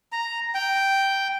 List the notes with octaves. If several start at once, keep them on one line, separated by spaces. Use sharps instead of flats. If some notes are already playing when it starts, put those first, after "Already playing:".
A#5
G5